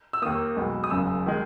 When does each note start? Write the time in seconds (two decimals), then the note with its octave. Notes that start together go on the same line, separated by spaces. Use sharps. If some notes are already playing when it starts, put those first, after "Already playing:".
0.13 E6
0.22 D#2 D#3 A#3 D#6
0.56 B1 B2 G#3 B3
0.84 D#6
0.90 F#1 F#2 C#3 E6
1.26 D#3 G#3